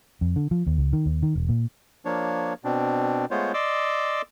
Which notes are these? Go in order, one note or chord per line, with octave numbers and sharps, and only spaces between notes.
F2
D3
F3
D#2
C#2
D#3
D#2
D#3
E1
A#2
F3 A#3 D4 C#5
B2 C4 D4
G#3 A3 B3 F4 C5 C#5
D5 D#5 C6 D6 E6